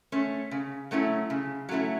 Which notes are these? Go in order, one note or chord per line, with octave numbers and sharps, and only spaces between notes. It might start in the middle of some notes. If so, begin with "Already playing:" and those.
A3 C#4
C#3
F#3 A3 C#4 E4
C#3
F#3 A3 C#4 E4